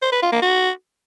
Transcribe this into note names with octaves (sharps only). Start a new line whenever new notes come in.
C5
B4
F4
A#3
F#4